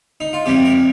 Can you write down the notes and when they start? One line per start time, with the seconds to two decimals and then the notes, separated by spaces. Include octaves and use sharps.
0.20 D#4
0.33 F4
0.46 F2 C3 G3 G4
0.65 A#4